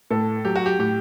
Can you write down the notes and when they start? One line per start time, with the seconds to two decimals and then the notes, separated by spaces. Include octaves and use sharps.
0.10 A2 A4
0.45 F#3 G4
0.55 F#4
0.66 G4
0.79 A2 G4